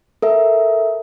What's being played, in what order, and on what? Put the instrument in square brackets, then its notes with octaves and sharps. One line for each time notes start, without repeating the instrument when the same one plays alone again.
[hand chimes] A4 A#4 E5